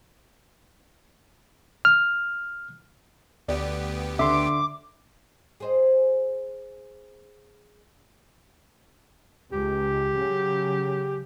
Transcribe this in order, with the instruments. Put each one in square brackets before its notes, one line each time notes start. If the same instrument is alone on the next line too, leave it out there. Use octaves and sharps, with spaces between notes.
[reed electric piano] F6
[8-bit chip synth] D2 B3 G4 [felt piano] D5
[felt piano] D3 [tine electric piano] E5 C6 [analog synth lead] D6
[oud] G#4 C5 D#5
[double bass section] C#2 [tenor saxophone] G4
[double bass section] C#3 F#3